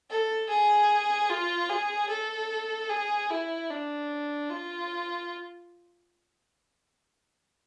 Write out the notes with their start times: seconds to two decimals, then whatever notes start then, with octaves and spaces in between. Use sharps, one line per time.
0.10 A4
0.49 G#4
1.30 F4
1.69 G#4
2.09 A4
2.89 G#4
3.30 E4
3.70 D4
4.50 F4